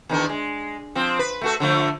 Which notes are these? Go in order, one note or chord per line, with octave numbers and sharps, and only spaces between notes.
E2 D#3 D4
G#3
F3 C4
B4
A3 F#4 A4
D3 F3 A3